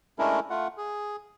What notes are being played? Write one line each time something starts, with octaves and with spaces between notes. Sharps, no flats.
G#3 A3 C#4 D4 E4 A#4
A3 F4 F#5
G#4